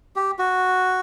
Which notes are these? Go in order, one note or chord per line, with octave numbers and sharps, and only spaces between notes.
G4
F#4